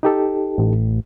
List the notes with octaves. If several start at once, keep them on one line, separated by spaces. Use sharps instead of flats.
D#4 G4 A4
A1